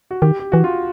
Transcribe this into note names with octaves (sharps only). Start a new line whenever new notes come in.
F#4
D#3 G4
G4
E3 F#4
F4